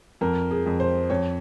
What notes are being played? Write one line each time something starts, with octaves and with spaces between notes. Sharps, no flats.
F2 A#4
G#4
F2
C5
F2 C#5